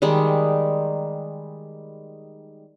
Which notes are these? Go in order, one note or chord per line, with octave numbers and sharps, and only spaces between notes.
D#3 G3 G#3 D#4